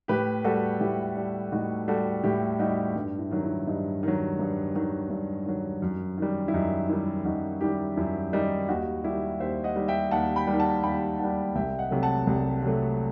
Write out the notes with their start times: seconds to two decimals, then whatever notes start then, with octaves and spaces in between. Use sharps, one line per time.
0.08 A2 G4 B4
0.44 G3 F#4 A4
0.81 A2 E4 G4
1.17 G3
1.52 A2 D#4 F#4
1.88 G3 F#4 A4
2.24 A2 E4 G4
2.59 G3 D#4 F#4
2.95 G2
3.19 E4
3.31 D#3 F#3
3.43 E4
3.67 G2 D#4
4.03 D#3 F#3
4.39 G2
4.75 D#3 F#3
5.10 G2
5.46 D#3 F#3
5.82 F#2
6.18 D#3 G3
6.48 E4
6.54 F#2 D#4
6.89 D#3 G3 E4
7.25 F#2 D#4 F#4
7.61 D#3 G3 E4 G4
7.97 F#2 E4
8.33 D#3 G3 D#4
8.68 D#2 D#4 F#4
9.04 D#3 G3 E4 G4
9.40 D#2 C5 E5
9.64 D#5 F#5
9.76 D#3 G3
9.88 E5 G5
10.11 D#2 F#5 A5
10.36 G5 B5
10.47 G3
10.52 D#3
10.60 F#5 A5
10.83 D#2 G5 B5
11.19 D#3 G3 F#5 A5
11.55 C2 E5 G5
11.79 D#5 F#5
11.91 C3 F#3 A3
12.03 F#5 A5
12.27 C2
12.62 C3 F#3 A3